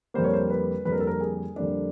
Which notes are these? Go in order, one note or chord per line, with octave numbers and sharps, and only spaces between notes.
F2 D3 G3 A#3 C5
C#5
C5
B4
F2 D3 G3 A#3 B4
A#4
A4
A#4
G#4
F2 D3 G3 A#3 D4